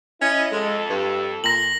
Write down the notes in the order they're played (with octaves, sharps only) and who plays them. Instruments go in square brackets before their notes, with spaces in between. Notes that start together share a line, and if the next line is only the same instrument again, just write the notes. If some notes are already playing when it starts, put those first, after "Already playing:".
[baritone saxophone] C#4 [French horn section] E4 D#5
[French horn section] F2 A4 [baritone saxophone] G#3
[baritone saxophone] G2
[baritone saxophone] A#2 [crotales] A#6 F#7